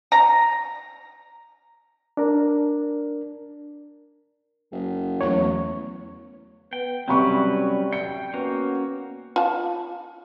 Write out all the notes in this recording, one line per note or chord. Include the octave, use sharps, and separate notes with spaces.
A#5
D4 A#4
F#1
E2 F#3 A3 C#4 E4 C#5
B3 G5
C3 F#3 G3 C#4 B4 B5 C#6
G5 C#7
A#3 B3 C#4 F#4
F4 A5